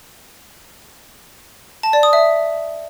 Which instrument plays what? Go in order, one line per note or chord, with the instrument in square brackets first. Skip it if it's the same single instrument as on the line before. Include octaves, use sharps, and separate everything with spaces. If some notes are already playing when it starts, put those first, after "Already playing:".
[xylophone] A5
D5
D#6
E5